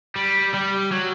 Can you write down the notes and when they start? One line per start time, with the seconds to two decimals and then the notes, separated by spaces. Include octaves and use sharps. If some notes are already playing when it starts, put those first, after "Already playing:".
0.16 G3
0.54 G3
0.92 F#3